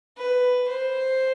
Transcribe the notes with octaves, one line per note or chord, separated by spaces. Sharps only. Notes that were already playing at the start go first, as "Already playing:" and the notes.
B4
C5